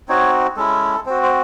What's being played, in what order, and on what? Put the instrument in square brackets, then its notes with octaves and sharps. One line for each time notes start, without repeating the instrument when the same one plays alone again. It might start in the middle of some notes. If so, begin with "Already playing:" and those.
[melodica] C4 D#4 F#4 C#5
G#3 C#4 E4 A4
C4 F#4 C5
C5